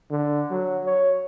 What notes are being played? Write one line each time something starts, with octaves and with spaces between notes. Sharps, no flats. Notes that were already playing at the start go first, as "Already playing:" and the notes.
D3
F#3
C#5